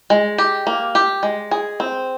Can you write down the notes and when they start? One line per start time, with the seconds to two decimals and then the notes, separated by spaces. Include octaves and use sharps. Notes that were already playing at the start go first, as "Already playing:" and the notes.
0.10 G#3
0.38 G4
0.67 A#3
0.95 G4
1.23 G#3
1.51 G#4
1.80 C4